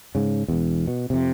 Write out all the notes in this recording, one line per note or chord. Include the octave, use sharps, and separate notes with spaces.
G#2 C#3
E1 E2
B2
F2 C3